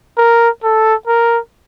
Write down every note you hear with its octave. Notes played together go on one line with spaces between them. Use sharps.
A#4
A4
A#4